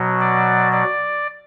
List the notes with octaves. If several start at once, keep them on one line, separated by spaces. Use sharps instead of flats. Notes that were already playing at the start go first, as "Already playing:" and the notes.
Already playing: B2 F#3
D5
D5